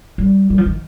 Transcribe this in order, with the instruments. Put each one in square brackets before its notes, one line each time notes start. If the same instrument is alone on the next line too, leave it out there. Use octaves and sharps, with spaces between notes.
[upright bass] G3
G3
F3
D#3